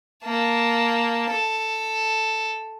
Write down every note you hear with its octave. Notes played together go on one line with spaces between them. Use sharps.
A#3 A5
A4